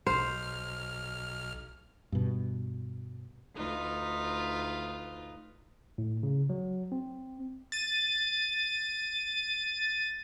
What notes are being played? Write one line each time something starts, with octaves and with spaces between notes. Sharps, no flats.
B1 C5 F6
G2 B2
D2 D#4 F4 B4
A2
C#3
F#3
C4
A6 D#7